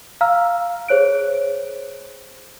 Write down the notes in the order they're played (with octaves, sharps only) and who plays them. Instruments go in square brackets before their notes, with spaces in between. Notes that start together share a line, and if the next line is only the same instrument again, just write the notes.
[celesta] F5 A#5 E6 F6
G#4 C5 C#5 F#6 D7